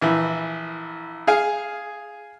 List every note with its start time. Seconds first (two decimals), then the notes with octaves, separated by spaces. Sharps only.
0.01 A#1 E3
1.27 G#4 F5 G#5